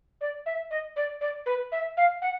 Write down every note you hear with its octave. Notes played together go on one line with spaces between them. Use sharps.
D5
E5
D#5
D5
D5
B4
E5
F5
F#5